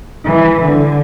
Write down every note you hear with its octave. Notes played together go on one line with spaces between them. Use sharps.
E3
D3